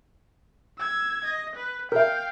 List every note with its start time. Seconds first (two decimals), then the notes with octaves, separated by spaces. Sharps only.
0.79 E6 G#6
1.25 D#5
1.56 B4
1.92 A#4 E5 F5 G5